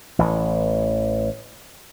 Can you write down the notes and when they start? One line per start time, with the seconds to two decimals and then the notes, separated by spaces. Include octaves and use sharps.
0.19 A1 E3